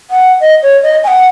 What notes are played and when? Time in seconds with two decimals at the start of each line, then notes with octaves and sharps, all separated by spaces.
0.11 F#5
0.41 D#5
0.63 C#5
0.83 D#5
1.04 G#5
1.08 F#5